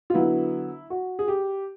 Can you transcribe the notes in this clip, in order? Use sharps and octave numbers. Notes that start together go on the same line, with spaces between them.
F4
D3 F#3 B3 E4
F#4
G#4
G4